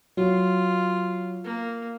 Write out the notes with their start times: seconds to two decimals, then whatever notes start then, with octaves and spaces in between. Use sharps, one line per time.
0.17 F#3 F4
1.44 A#3